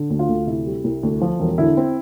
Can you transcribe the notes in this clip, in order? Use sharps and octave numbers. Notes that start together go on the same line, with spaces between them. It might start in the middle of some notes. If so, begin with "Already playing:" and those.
Already playing: D3
D2
F4
D2
C3 E4
G3
C2
D2
F3
E1
D3 E4
C4